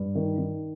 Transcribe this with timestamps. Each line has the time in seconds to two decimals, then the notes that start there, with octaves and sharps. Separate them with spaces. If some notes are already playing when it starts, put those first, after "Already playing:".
Already playing: G2
0.15 D#3
0.38 D#3